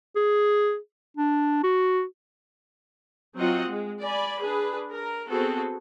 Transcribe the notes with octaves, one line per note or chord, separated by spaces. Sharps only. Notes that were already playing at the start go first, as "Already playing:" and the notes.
G#4
D4
F#4
F#3 C4 F4 D#5 F#5
G#3
D5 G#5 B5
D4 G#4 B4
A#4
B3 C4 F#4 G#4 A4